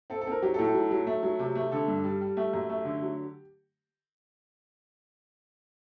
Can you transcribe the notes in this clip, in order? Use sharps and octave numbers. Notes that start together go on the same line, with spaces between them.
C4 A4
A4
C4 A#4
F#3 G4
A4
A2
A4
F#3
F#3
A3
F#3
C3
A3
D3 A4
G2
G3
G3
A3 G4
F#2
A3
D3
F#3